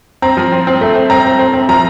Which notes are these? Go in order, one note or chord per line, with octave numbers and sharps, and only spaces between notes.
C4 A#5
F3
C4
C4
A3
C4
C4 A#5
C4
C4
C4
F3 A#5